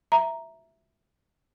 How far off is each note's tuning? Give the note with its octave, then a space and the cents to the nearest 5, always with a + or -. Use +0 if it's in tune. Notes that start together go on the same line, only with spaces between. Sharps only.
E5 +0 A#5 +0